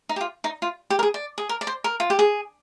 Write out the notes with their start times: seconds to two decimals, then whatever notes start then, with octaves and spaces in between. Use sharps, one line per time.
0.09 D#4
0.16 G4
0.21 F4
0.44 D#4
0.62 F4
0.90 G4
0.99 A#4
1.03 G#4
1.14 D5
1.38 G#4
1.49 A#4
1.61 D5
1.67 C5
1.84 A#4
2.00 F4
2.10 G4
2.19 G#4